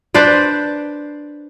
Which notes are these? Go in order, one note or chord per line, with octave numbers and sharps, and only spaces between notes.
D4 B4 C5 D5